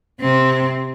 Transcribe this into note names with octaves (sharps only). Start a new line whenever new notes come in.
C3 C4